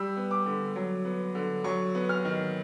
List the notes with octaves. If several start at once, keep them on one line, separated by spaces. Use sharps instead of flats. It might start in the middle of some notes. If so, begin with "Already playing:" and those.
Already playing: G3 E6
B3
D6
D3
F#3
B3
D3
F#3 C#6
B3
F6
D#3